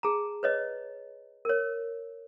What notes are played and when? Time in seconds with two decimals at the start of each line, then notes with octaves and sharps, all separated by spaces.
0.03 G#4 A5 A#5
0.43 B4 C#5 D#5
1.45 A#4 C#5